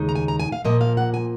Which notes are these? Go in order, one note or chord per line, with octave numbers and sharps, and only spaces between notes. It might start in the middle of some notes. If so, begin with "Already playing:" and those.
Already playing: D#2 C#3 G#3 D#4
A#5
G#5
A#5
G#5
F5
A#2 F3 A#3 D#5
F5
F#5
G#5